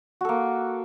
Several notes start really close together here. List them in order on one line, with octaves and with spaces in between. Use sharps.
F#4 A4 A#3